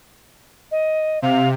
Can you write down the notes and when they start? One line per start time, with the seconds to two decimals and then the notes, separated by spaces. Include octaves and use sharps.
0.71 D#5
1.22 C3 F5